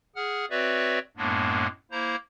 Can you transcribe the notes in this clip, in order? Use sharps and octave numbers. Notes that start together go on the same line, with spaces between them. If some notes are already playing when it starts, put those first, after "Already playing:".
G#4 F#5 F6
C4 F#4 B4 C#5 D5 E5
F#2 A2 G#3 A#3 B3 D4
A#3 E4 C5 A#5